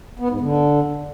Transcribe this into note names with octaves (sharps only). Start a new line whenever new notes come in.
B3
G#2
D3